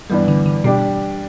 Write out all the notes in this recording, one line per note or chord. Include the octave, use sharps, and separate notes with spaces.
G2 E3 G3 B3
D3
D3
B2 G3 D4 G4